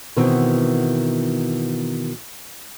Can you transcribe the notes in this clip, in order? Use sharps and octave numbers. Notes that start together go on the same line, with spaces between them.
B2 D#3 E3 B3 C4